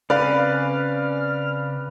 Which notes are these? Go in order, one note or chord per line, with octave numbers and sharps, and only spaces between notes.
C#3 C4 C#4 B4 D5 F5 F6